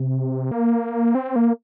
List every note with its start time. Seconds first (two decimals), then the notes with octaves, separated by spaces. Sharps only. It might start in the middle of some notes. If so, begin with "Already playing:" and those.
Already playing: C3
0.51 A#3
1.15 C4
1.36 A#3